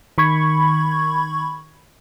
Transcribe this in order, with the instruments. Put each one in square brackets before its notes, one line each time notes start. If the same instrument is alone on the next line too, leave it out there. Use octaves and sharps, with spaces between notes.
[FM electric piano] D#3 B5 C#6 G#6